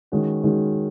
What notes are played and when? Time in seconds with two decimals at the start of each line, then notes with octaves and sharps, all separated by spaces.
0.12 D#3 G#3 C#4 F#4
0.44 D#3 G#3 C#4 F#4